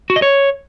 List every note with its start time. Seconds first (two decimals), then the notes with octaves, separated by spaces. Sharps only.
0.10 F#4
0.16 D#5
0.22 C#5